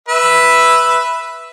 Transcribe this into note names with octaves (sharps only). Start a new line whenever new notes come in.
B4 E5